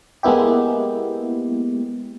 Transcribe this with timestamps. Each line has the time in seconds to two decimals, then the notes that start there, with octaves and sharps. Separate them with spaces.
0.23 G#3 A#3 B3 E4 G4